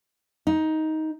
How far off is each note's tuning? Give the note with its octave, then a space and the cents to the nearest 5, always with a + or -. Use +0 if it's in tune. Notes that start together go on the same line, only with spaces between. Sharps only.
D#4 +15